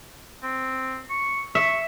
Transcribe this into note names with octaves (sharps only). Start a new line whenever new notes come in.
C4
C#6
E5 C#6